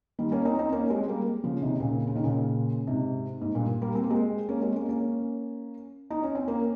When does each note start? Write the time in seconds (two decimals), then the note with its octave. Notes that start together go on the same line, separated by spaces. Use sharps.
0.19 D#3 G3
0.32 A#3 C#4
0.45 C4 D#4
0.59 C4 D#4
0.72 A#3 C#4
0.90 G#3 C4
1.08 G3 A#3
1.44 C#3 F3
1.62 C3 D#3
1.80 A#2 C#3
2.07 C#3
2.15 D#3
2.24 A#2 C#3
2.87 G#2 C3
3.41 G#2
3.55 G2 A#2
3.82 G3 A#3
3.95 C4
4.03 A#3
4.10 G#3 C4
4.49 A#3 C#4
4.62 G#3 C4
4.76 A#3 C#4
4.89 A#3 C#4
6.10 D#4
6.23 C#4
6.35 C4
6.48 A#3 C#4